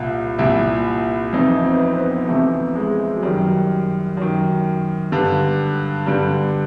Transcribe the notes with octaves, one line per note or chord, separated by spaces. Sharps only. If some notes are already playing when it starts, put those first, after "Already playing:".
Already playing: C2 A#2 F4
C2 A#2 E4
F2 C3 E3 D#4
C4
B3
C4
B3
F2 C3 E3 A3
G#3
F#3
F#2 D#3 G3
F#2 D#3
G2 D3
G2 D3 G3